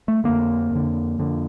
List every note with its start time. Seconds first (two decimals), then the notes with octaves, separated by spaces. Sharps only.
0.08 A3
0.24 F2 D3 A#3
0.71 F2 D3
1.19 F2 D3